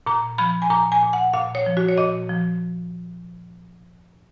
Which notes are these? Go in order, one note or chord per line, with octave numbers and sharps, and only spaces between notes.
A#2 A#5
F3 B5
G#5
A#2 A#5
G#5
A#2
F#5
A#2 F5
C#5
F3
F#4
C#5
A#2 D#5
F3